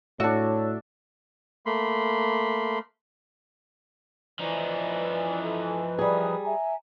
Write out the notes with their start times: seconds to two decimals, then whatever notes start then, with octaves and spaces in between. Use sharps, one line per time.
0.20 A2 D4 F#4 C#5 E5
1.66 A3 A#3 B5 C6
4.39 E3 F3 D#4 D5
5.43 A4
5.99 G3 G#4 B4 A#5 D#6
6.44 E5 G#5 A#5